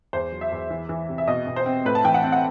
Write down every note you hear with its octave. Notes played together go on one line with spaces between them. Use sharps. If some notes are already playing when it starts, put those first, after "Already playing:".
E2 C5
F#3
E5
E2
E3
E3
C3
E5
B2 D#5
B2
C5
C4
A2 B4
A5
E3 G5
F#5
C4
F#5